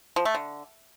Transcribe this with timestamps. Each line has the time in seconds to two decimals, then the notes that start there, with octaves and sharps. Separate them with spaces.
0.16 F3
0.25 A3
0.35 D3